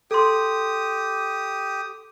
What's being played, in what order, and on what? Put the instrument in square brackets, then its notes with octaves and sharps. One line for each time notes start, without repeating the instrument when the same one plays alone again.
[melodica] G4 D#6 [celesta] A4 C6